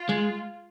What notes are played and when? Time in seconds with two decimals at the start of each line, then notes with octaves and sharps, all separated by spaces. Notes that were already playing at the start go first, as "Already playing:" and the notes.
Already playing: F4
0.09 G#3